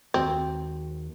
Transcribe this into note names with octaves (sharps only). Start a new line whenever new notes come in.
D#2 G#3 C4 F#4